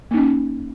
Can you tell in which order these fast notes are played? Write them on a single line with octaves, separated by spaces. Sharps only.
A#3 D#4 C#4